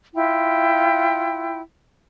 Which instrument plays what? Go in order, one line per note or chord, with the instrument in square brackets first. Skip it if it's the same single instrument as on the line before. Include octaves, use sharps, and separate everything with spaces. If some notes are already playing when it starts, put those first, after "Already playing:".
[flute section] E4 F4 G5